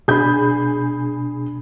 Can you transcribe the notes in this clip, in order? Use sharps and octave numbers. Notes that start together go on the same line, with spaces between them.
B2 D4 G#4 B5 G6